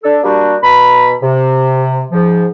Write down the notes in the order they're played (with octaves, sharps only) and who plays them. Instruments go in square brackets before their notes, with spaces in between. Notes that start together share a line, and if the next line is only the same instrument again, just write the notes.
[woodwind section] D4 A4
G3 A#3 D4 F#4 G4
B2 A#5 B5
C3
G#2 F3